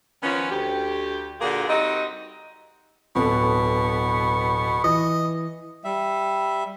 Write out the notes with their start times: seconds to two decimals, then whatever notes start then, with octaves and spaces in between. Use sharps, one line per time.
0.23 D#3 F3 B3 C#4
0.51 D2 G4
1.40 A#2 D3 A#3 F4 F#4 G#4
1.68 G3 C4 D#4 F#4 G4 D#5
3.15 D1 B2 B3 A4
4.84 E3 D#5
5.84 G3 E5